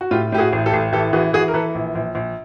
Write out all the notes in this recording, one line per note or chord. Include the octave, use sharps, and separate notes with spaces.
F#4
A2 F4 G4
A2 G4
F#4 G#4
A1
G4 A4
A1
E3 G4 A4
E3 F#4 G#4
E3 F#4 G#4
A#4
E3 A4 B4
A#1
A#1
A#1